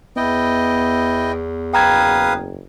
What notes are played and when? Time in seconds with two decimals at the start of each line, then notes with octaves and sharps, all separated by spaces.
0.17 E2 B3 E4 D#5 G5
1.74 F#1 B4 F5 G5 A#5 D#6 G#6